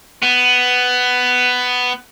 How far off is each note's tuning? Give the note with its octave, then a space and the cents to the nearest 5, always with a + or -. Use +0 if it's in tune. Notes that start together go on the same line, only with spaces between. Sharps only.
B3 +10